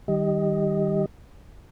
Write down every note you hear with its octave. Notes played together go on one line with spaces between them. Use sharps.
D#3 G3 G4 D#5